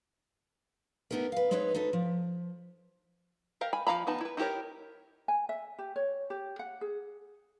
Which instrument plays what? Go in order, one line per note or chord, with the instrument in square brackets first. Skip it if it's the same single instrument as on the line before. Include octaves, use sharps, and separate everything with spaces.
[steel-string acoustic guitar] A3 B3 D#4 G4 A#4
B4 F5
G#3 C4 D#4 B4 C#5
D#4 F#4 A4 B4
F3
[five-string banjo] G4 A#4 F5
G#5 B5
F3 E4 F5 A#5 B5
D#3 B3 D#4 A5 B5
E4 B4
D#4 E4 G4 A#4 C#5
[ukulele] G#5
E5
G4
C#5
G4
F#5
G#4